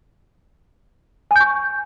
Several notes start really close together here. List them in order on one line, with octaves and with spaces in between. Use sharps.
G#5 G6 C#6